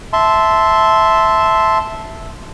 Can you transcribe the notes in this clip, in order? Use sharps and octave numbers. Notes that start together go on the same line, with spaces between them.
E5 A5 C6